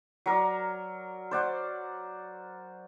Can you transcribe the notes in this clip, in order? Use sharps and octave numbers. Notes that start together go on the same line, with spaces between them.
F#3 A#4 D5
C5 D5 F#5